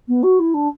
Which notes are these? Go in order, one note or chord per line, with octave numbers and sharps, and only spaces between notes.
B3
F#4
E4
D4